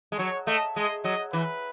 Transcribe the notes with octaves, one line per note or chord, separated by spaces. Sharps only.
G#3
F#3 C#5
A3 D#5
G#3 D#5
F#3 D#5
E3 B4